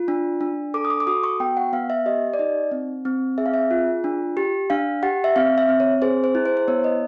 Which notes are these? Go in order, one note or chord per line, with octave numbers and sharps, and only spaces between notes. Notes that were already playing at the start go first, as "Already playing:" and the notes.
Already playing: F4
D4
D4
A4 D6
D#6
D6
D6
F#4 D#6
C#6
B3 G5
F#5
B3 F5
E5
G4 D#5
D5
D#4 D#5
C4
C4
G#4 E5
F5
E5
F4
D4
G4
D4 F5
G4 F#5
E5
C4 F5
E5
C4
C#5
G#4 C5
C5
E4
C5
C5
B3 C#5
D#5